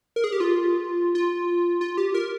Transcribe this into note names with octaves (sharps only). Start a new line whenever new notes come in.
A#4
G#4
G4
F4
F4
F4
G4
A#4